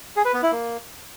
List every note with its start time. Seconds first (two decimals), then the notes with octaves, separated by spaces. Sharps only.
0.16 G#4
0.25 B4
0.34 B3
0.43 E4
0.52 A#3